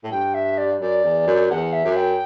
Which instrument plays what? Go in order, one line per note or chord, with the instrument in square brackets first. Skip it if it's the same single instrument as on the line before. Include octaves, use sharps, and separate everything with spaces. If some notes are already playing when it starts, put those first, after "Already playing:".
[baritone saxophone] A2
[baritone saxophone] G2 [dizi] G5
[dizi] E5
D5
[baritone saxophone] F#2 [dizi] D5
[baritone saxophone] E2
F#2
[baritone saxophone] E2 [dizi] F#5
[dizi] E5
[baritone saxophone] F#2
[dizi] G5